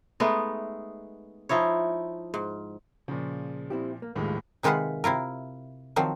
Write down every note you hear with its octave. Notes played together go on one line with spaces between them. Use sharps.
G#3 A3 B3 D#4
F3 D#4 E4 C#5
G#2
A#2 C#3 F3
C4 E4 G4
A#3
D#1 D#2 A2 D#3 F3 G#3
C3 D#3 G#3 F4 B4 F#5
C3 E4 F4 A#4
D#3 F3 F#3 C4